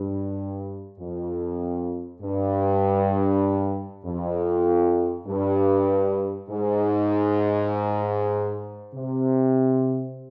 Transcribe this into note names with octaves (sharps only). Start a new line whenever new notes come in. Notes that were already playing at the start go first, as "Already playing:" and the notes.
Already playing: G2
F2
G2
F2
G2
G#2
C3